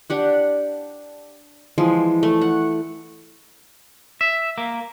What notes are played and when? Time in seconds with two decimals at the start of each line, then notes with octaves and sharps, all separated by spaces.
0.10 D4 G4 F#5
1.78 E3 F3 G#3
2.23 A3
2.42 F#5
4.21 E5
4.58 A#3